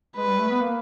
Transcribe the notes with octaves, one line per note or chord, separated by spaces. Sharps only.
G#3 B4
G3
A3
B3
A#3